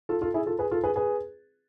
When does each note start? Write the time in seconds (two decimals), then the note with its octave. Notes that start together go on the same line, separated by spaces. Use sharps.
0.09 F4 A4
0.21 F4 A4
0.34 E4 G#4
0.46 F4 A4
0.59 G#4 B4
0.71 F4 A4
0.84 G#4 B4
0.96 G#4 B4